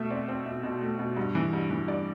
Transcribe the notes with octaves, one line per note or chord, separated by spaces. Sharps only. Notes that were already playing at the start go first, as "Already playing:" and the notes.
Already playing: B2 A3 E5
C4 D5
C4
B2 E5
B2
A3
B2
G2
E3
G2
E3
G2 D5